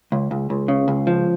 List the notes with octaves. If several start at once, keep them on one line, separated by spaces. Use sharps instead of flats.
C#2
C#2
C#2
C#3
C#2
F3